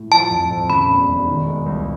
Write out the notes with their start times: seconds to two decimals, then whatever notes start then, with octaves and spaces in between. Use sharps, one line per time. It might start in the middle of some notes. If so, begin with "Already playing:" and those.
Already playing: A2
0.12 F3 A5
0.31 F2
0.51 F2
0.70 C#3 B5
0.90 E1
1.08 E1
1.27 D#3
1.47 G#3
1.66 C#2